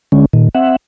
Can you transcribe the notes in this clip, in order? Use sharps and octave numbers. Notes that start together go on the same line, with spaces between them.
D3 G#3 C#4
A#2 D#3
C4 E5 F#5